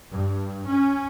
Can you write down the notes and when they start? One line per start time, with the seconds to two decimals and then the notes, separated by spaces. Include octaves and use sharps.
0.12 G2
0.69 C#4